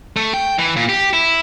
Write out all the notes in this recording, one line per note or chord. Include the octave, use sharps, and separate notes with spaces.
A3
G5
E3
A#2
G4
E4